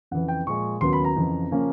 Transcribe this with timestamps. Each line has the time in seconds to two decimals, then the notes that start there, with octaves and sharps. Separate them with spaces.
0.11 F2 C#3 E3 F#5
0.28 G5
0.47 A#2 F3 G#3 C#6
0.81 D#2 C#3 F#3 B3 C6
0.93 B5
1.04 A#5
1.16 F2 C#3 E3
1.51 C#3 F3 A#3 C#4